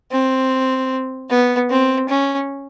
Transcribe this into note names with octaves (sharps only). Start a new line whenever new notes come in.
C4
B3
C4
C#4